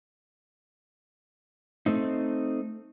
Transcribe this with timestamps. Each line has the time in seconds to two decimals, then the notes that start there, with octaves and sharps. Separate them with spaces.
1.86 A3 C4 D#4